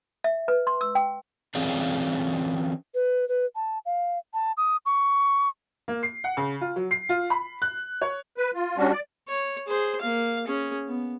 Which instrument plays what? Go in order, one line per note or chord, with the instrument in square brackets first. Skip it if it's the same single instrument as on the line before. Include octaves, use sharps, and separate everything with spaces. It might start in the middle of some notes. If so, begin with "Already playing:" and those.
[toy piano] E5
B4
C6
E6
G5
[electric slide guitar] E3 C4 C#4 F4 G#4 D5
[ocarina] B4
B4
A5
F5
A5
D#6
C#6
[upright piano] A#3
C7
F#5
C#3
F4
F#3
C7
F4
B5
F#6
C#5
[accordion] B4
F4
G3 C#4 D4 F#4
D5
[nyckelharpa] C#5
G#4 C5
A#3 F5
C#4 G#4
B3